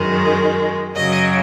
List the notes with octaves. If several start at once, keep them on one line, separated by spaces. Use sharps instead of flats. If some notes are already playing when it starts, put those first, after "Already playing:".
Already playing: F#2 D#3 G#3
F#2 C#3 F#3 D#5